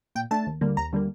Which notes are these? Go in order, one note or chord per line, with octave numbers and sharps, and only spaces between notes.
A#2 G5
A3 D4 A5
D#2
D3 G3 A#3
D#2 A#5
D3 G3 A#3